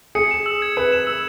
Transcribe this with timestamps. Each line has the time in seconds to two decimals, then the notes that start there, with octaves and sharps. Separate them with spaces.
0.15 G#4 C#7
0.31 E7
0.46 E6
0.62 G#6
0.77 B4 C#7
0.92 E7
1.07 E6